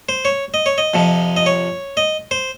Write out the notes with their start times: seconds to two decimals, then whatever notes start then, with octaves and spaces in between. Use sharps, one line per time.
0.09 C5
0.25 C#5
0.54 D#5
0.66 C#5
0.78 D#5
0.94 F2 C3 F3
1.37 D#5
1.46 C#5
1.97 D#5
2.31 C5